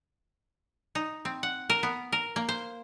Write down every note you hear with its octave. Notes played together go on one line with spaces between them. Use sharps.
D#4
C4
F#5
A#4
B3
A#4
A#3
C5